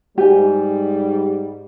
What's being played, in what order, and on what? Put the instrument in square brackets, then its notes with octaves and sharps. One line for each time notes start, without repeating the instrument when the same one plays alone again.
[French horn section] G#2 G3 [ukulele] G4 G#5